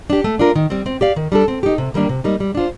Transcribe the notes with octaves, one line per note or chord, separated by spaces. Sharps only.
D4 G4
A3
D4 F4 A#4
D#3
G3 C4
C4
G4 D5 F5
D#3
G3 D4 A4
C4
D#4 G4
C3
D#3 G3 A#3 D4
C3
G3 A#3 D#4
G3
D4 F4 C5